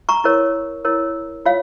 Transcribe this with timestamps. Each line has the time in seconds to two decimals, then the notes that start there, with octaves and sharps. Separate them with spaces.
0.09 A#5 C#6
0.24 E4 A#4 C#5
0.85 E4 A#4 C#5
1.46 F4 C#5 F5